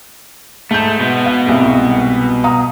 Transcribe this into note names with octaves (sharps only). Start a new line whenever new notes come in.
G#2 A3 G6
B2 B3
F5
C2 G#2
F5 A#5 D#6